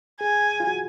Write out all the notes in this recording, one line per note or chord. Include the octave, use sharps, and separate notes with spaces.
G#4 G#5
F4
F#4